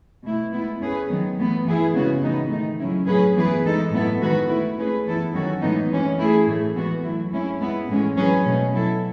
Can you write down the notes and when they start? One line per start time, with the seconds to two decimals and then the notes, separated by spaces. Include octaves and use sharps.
0.24 B2 A3 E4
0.52 G#3 B3 E4
0.80 A3 C#4 G#4 B4
1.08 D#3 F#3 B3
1.37 A2 E3 B3
1.65 E3 B3 E4 G#4
1.94 C#3 G#3 B3 F#4
2.22 A2 E3 B3 D#4
2.50 D#3 A3 D#4
2.79 C#3 F#3 C#4 E4
3.07 A2 F#3 C#4 G#4 B4
3.35 E3 B3 E4 G#4 B4
3.64 E3 G#3 D#4 A4
3.91 A2 F#3 B3 E4 A4
4.21 D#3 G#3 B3 F#4 B4
4.49 A3 E4 B4
4.77 A3 C#4 G#4 B4
5.05 E3 B3 E4 A4
5.33 D#3 F#3 C#4 F#4 A4
5.62 A2 E3 G#3 B3 D#4
5.90 E3 G#3 C#4
6.19 A3 E4 G#4
6.47 A2 E3 A3
6.74 E3 G#3 B3 F#4
7.04 F#3 A3 E4
7.31 G#3 C#4 E4
7.60 G#3 B3 E4
7.88 A2 E3 G#3 C#4
8.17 F#3 C#4 G#4 B4
8.45 B2 A3 C#4
8.74 F#3 B3 E4 A4